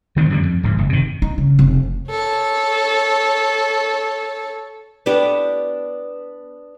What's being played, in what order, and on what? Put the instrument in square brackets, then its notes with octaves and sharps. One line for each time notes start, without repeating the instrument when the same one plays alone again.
[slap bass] D#3 A3 B3 C4
F#2 D3 F3 G3
F2
D1 G#2
F#1
C3 D#3
[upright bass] D#4
C#3
F1
[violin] A4 C#5
[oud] B3 D4 G4